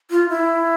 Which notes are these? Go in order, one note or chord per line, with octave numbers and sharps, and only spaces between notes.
F4
E4